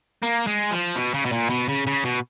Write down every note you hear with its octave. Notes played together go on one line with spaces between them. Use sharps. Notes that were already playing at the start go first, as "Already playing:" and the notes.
A#3
G#3
F3
B2
C#3
B2
A#2
B2
C#3
C#3
B2